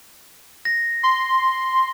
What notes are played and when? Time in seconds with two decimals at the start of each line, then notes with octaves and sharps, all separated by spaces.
0.65 A#6
1.03 C6